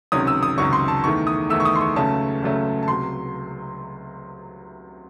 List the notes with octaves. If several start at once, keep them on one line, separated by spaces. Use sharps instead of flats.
C#2 C3 D#3 F#3 C#4 D#6
E6
D#6
C#2 C3 D#3 F#3 C#4 C#6
C6
A5
E2 D#3 A3 C#6
D#6
E2 D#3 A3 E6
C#6
D#6
C6
C#6
C#2 C#3 F#3 A3 C#4 A5
C#2 C#3 F#3 A3 C#4
A5
C#2 C3 F#3 C6